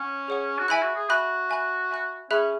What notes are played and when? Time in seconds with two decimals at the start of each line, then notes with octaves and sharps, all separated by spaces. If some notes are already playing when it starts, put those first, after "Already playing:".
Already playing: C#4 C#5 F#5 C#6
0.28 G#4 C#5 F#5 C#6
0.59 F#4
0.68 E4 E5 G#5 B5 F#6
0.82 F#4
0.96 G#4
1.09 F#4 E5 G#5 B5 F#6
1.50 E5 G#5 B5 F#6
1.91 E5 G#5 B5 F#6
2.31 C#4 G#4 E5 B5 F#6